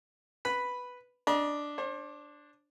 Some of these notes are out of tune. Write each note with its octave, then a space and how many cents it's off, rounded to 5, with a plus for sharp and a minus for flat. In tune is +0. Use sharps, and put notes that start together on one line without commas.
B4 +0 B5 +0
D4 +0 D#5 +0 A#5 +45
D4 +0 C5 +40